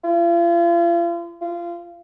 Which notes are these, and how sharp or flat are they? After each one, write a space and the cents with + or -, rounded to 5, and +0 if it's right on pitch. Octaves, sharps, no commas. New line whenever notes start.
F4 -40
F4 -25